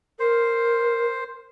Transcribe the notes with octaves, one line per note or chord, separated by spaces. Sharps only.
A#4 C5